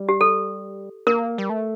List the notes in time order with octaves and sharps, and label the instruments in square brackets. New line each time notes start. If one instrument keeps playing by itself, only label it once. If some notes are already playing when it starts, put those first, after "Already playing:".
Already playing: [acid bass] G3
[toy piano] G4
A4
[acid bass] A#3 [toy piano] A#4
[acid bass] G3
A3